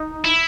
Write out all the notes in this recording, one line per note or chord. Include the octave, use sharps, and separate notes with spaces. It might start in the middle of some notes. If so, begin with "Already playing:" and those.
Already playing: D#4
E4